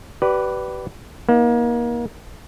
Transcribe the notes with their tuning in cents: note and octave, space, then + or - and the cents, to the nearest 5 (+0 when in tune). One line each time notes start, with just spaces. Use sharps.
G4 -35 B4 +0 D5 +0
A#3 +30 D#4 +30